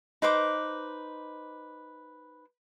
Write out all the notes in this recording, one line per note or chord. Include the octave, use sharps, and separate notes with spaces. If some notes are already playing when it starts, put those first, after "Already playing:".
D#4 B4 C5 D6